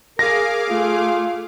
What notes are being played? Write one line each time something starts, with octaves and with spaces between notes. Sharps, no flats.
G#4 A#4 F5 D6 A#6
A3 F4